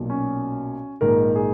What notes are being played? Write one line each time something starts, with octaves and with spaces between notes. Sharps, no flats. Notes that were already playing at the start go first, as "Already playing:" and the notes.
Already playing: B1 A#2 F#3
C#4
A#1 G#2 D#3 A#4
G#4